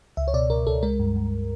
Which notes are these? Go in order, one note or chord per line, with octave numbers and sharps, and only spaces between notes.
C#2 E5
C#5
B2 D5
C#2 A#4
C#2 A4
G#3 A#4
G2
G2